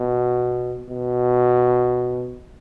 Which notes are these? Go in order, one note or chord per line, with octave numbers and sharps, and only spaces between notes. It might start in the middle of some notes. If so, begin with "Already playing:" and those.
Already playing: B2
B2